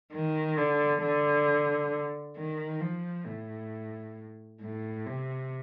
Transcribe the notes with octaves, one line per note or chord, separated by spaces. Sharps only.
D#3
D3
D3
D#3
F3
A2
A2
C3